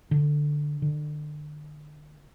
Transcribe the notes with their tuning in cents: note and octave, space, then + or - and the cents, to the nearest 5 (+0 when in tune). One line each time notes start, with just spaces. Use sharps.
D3 +10
D3 +35